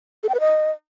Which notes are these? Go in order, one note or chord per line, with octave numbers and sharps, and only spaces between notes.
A4
G5
B4
D#5